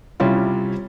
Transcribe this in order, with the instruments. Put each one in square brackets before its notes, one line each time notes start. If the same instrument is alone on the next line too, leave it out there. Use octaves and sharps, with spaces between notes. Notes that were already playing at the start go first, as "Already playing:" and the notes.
[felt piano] C3 G3 C#4 E4 F4